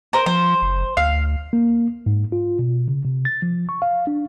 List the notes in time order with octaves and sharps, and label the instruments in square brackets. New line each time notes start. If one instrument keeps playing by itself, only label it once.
[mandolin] A#4 C5
[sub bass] F3 [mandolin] C5
[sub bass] F#1
[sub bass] D2 [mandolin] F5
[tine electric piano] A#3
G#2
F4
B2
C#3
C3
A6
F3
C#6
F5
D4